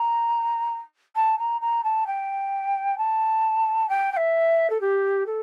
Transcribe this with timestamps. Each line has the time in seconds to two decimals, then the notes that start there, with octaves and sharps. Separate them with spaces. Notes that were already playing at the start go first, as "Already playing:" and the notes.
Already playing: A#5
1.16 A5
1.39 A#5
1.61 A#5
1.84 A5
2.07 G5
2.98 A5
3.89 G5
4.12 G5
4.17 E5
4.70 A4
4.81 G4
5.26 A4